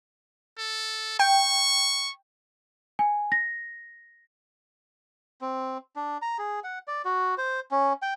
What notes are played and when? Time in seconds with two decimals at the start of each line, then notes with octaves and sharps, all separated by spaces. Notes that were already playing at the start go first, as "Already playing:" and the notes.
0.58 A4
1.19 G5 C#6
2.99 G#5
3.32 A#6
5.41 C4
5.96 D4
6.22 A#5
6.39 G#4
6.64 F#5
6.88 D5
7.05 F#4
7.38 C5
7.71 C#4
8.02 G5